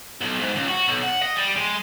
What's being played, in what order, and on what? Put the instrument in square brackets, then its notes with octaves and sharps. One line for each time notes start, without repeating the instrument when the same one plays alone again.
[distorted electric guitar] B1
G#2
C#2
F#4
B1
F#5
D#5
G3
G#3